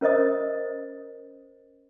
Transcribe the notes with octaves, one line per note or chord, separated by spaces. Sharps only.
C#4 A#4 C5 D#5 D#6